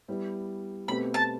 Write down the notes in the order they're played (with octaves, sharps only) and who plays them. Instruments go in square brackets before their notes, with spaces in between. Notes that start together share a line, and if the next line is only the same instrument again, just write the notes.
[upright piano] G3 B3 E4
[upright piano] B2 A3 C4 G4 B4 [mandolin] B5
[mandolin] A5